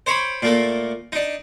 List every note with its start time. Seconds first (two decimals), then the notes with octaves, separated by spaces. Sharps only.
0.06 C5 C#5 B5 D6
0.42 A#2 A3 A#3
1.12 D4 D#4